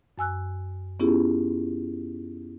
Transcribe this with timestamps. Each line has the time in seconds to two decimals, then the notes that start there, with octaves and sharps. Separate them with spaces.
0.18 F#2 G#5 E6 F#6
1.00 B3 C#4 E4 F4 G4 G#4